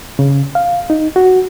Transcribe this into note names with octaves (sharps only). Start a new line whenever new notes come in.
C#3
F5
D#4
F#4